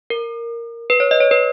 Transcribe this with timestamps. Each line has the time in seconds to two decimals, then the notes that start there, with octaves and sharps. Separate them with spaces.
0.10 A#4
0.90 B4
1.00 C#5
1.11 D#5
1.20 C#5
1.31 B4